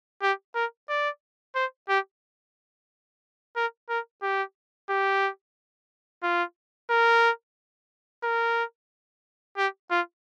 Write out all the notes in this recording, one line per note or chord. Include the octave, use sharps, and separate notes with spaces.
G4
A#4
D5
C5
G4
A#4
A#4
G4
G4
F4
A#4
A#4
G4
F4